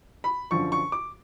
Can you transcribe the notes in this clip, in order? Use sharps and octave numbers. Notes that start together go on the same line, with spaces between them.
B5
F#2 D3 F3 C#6
C#6
D6